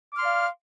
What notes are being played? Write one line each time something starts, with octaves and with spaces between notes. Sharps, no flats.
D5 F5 C6 D6 F6